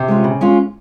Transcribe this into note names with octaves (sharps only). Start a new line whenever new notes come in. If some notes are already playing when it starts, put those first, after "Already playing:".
Already playing: C3
G#3 C#4 F4
C#3
G#3 C#4 F4